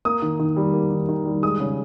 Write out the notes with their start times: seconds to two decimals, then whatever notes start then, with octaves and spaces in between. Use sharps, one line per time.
0.05 A#3 D#6
0.22 D#3
0.40 D#3
0.57 G3
0.73 A#3
0.91 D#3
1.09 D#3
1.26 G3
1.43 G#3 D#6
1.60 C#3